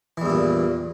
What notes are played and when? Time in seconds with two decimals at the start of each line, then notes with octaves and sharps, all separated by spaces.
0.17 E3
0.22 E2
0.26 G2
0.30 A#2